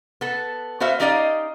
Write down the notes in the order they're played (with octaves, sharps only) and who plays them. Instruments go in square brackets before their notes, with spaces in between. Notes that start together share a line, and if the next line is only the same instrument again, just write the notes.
[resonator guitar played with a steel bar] B3 A4
B3 F#4 C5 E5 F5
C#4 D#4 G4 D5 D#5 F5